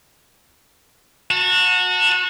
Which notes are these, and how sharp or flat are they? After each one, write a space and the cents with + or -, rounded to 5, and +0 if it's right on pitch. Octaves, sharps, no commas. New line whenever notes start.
F#4 -25 A5 +20